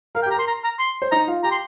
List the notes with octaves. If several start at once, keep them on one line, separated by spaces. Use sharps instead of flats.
A#4 F5
G5
G4 A#5
A#4 C6
A#5
A#5
C6
C5
D#4 D#5 A#5
F4 F5
G4 G5 A#5
C6